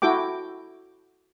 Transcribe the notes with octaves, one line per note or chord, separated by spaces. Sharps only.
E4 F#4 A4 G5 D6